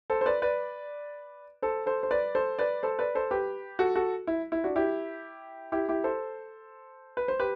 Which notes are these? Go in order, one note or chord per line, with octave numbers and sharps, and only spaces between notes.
A4 C5
C5
B4 D5
B4 D5
A4 C5
A4 C5
C5
B4 D5
A4 C5
B4 D5
A4 C5
B4 D5
A4 C5
G4 B4
F#4 A4
F#4 A4
E4
E4
D4 F#4
E4 G4
E4 G4
E4 G4
A4 C5
B4
C5
G4 B4